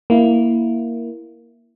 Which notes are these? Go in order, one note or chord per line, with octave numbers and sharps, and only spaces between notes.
A#3 E4